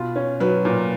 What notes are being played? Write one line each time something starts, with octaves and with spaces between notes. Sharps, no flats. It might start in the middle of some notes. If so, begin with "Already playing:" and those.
Already playing: B2 F4
C#4
F#3 B4
A#2